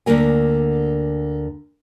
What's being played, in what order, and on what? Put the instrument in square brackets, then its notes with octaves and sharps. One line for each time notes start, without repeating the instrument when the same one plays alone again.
[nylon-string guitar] D2 D3 A#3 A#4 G#5